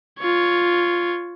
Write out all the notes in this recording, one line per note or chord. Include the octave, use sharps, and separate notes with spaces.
F4 C#5